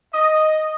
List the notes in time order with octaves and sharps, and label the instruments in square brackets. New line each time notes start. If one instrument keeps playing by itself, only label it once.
[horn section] D#5